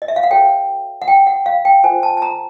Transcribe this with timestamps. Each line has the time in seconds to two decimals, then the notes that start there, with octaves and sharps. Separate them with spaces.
0.02 D#5
0.08 E5
0.16 F5
0.23 F#5
0.30 F#4 A4 C#5 G5
1.02 F#5
1.08 G5
1.27 F#5
1.46 F5
1.65 G5
1.83 F4 A4 C5 G#5
2.03 A5
2.17 A5
2.22 A#5